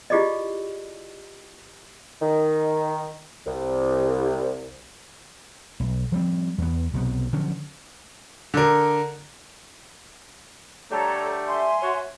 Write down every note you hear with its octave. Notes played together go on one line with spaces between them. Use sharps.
E4 F4 G4 G#4 D5 D#5
D#3
C2
B1
F3 G3 C4
E2 B3
B1 C3 B3
D3 F3 F#3 C#4
D3 A#4
D3 G3 A3 A4 C#5 A#5
E5 G#5 C6
F#4 C#5